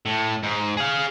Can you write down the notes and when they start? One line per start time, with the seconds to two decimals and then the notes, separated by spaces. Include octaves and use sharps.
0.06 A2
0.43 G#2
0.77 G#4 F5